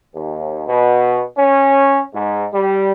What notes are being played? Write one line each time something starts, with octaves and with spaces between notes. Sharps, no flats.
D#2
B2
C#4
G#2
G3